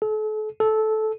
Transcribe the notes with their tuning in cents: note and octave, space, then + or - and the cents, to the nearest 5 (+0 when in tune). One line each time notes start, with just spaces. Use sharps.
A4 -40
A4 -15